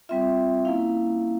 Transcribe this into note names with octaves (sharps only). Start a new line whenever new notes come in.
G3 C4 F4 E5
A#3 C#4 E4 F5